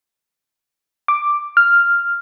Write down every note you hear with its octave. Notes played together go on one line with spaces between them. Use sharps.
D6
F6